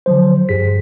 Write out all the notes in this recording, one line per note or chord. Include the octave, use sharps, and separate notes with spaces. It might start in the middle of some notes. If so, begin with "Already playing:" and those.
D3 F3 F#3 C5
G2 G4 G#4 B6